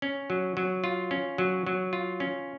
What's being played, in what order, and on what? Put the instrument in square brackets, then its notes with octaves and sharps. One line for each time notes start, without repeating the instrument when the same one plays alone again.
[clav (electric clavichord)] C#4
F#3
F#3
F4
C#4
F#3
F#3
F4
C#4